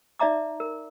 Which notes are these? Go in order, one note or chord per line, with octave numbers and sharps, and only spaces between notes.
D#4 D5 E5 A#5 D6
A#4